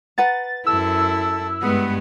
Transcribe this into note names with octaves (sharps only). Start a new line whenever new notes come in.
B4 F#5 A#5 A6
F#2 E4 A4 E6
G2 G#3 B3 G#4 F#5 B5